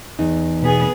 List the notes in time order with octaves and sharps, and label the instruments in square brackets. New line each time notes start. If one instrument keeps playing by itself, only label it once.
[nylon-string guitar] E2 D#4
[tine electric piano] B2 [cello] B3 G#4